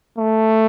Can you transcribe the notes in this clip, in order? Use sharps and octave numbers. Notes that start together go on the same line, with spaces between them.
A3